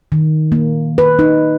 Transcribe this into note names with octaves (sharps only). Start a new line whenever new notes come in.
D#3
A#3
B4
D#4